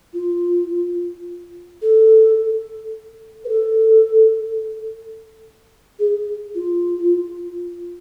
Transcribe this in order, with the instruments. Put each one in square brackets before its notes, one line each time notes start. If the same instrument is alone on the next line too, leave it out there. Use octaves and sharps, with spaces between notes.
[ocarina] F4
A4
B4
A4
G#4
F4